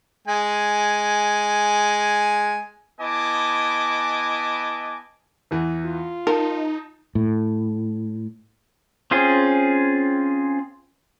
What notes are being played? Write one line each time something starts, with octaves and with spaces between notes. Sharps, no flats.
G#3 G#5
B3 E4 D#5 G#5 A5 D6
E2 E3
F4
D#4 A#4 A5
A2
C4 C#4 F4 G#4